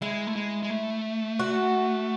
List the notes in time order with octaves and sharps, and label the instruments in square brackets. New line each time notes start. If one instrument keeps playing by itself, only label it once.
[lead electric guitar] G#3 [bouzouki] E4
[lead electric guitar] A3
G#3
G#3
A3
[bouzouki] F#4